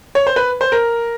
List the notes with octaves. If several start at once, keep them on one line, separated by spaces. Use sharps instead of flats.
C#5
C5
B4
C5
A#4